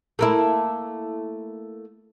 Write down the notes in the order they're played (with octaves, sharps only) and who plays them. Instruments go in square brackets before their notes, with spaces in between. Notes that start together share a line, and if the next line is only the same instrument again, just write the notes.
[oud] A3 A#3 E4